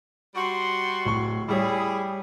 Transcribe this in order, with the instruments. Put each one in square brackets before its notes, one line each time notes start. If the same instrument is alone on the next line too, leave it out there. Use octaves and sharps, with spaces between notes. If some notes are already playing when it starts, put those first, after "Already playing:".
[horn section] G3 F#4 C6
[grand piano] D1 C#6
[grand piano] G3 G4 C#5 [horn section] E4 G#4